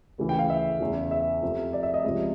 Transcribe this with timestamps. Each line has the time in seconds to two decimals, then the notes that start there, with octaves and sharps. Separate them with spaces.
0.18 D2 C#3 E3
0.29 G5
0.39 F5
0.50 E5
0.80 E2 C#3 E3
1.11 E5
1.42 F2 C3 F3
1.73 D5
1.83 E5
1.94 D#5
2.04 C#2 C3 F3